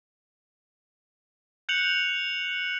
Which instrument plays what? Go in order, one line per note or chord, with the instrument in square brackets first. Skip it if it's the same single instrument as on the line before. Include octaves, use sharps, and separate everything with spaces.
[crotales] F#6 G6 C#7 F7 F#7